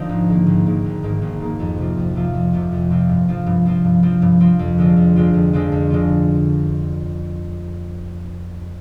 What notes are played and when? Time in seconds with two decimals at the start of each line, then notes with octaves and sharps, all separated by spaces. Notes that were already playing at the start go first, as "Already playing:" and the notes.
Already playing: D3 F3 C4 D#4
0.09 G#1
0.28 G#2 D#3 A#3
0.47 G#1
0.66 G#2 D#3 A#3
0.84 G#1
1.03 G#2 D#3 A#3
1.22 G#1
1.40 G#2 D#3 A#3
1.59 F2
1.78 C3 F3 C4 F4
1.97 F2
2.15 C3 F3 C4 F4
2.34 F2
2.53 C3 F3 C4 F4
2.72 F2
2.90 C3 F3 C4 F4
3.09 G2
3.28 F3 C4 F4
3.46 G2
3.65 F3 C4 F4
3.84 G2
4.03 F3 C4 F4
4.22 G2
4.40 F3 C4 F4
4.59 F2
4.78 D3 G#3 C4 F4
4.97 F2
5.16 D3 G#3 C4 F4
5.34 F2
5.53 D3 G#3 C4 F4
5.72 F2
5.90 D3 G#3 C4 F4